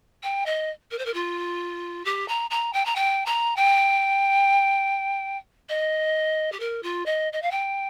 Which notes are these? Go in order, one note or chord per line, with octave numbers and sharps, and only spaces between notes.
G5
D#5
A#4
C5
A#4
F4
G4
A#5
A#5
G5
A#5
G5
A#5
G5
D#5
G4
A#4
F4
D#5
D#5
F5
G5